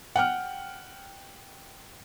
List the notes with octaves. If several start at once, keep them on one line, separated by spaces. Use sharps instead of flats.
F#5 G5 F6